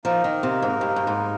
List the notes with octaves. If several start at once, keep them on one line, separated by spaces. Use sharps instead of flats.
F3 A#3 D#4 A#4
D#3
C3
G#2
G2
G2
G#2